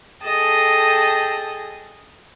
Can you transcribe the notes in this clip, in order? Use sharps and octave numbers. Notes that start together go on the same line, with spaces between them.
G#4 A4 D#5 G5 A5